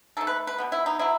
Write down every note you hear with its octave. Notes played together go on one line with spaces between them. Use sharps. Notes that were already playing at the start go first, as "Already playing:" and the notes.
D#3 A3 A4
B4
B4
B2 G3 B3
E4
D#4
B2 F#3 E4